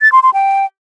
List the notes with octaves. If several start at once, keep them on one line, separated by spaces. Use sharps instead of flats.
A6
C6
C6
G5